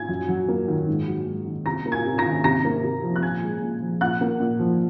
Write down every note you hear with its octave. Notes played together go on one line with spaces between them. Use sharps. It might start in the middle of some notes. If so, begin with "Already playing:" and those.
Already playing: G#5 G#6
F#2
F#3
A#3
D#3
G#2
F#3
G#2
D#3
C3 A#5 A#6
A#3
G#5 G#6
C3
A#5 A#6
D#3
C3 A#5 A#6
A#3
C3
F3
F#6
A#2 G#5 G#6
G#3
A#2
F3
A#2 F#5 F#6
A#3
A#2
F3